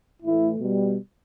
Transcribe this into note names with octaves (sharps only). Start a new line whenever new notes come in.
A2 E3 A3 E4
B2 G3